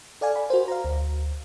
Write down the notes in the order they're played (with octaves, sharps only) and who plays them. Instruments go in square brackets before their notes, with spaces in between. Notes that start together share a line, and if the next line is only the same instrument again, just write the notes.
[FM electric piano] A4 D5 F5 G#5
B5
F#4 A#4 C5
F5 A#5
D2